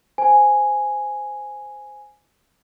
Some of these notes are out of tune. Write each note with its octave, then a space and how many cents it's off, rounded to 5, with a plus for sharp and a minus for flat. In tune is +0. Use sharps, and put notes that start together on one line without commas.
C5 -15 G#5 +0